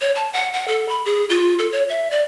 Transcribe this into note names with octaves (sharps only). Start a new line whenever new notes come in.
C#5
A5
F#5
F#5
A4
B5
G#4
F4
A4
C#5
E5
D5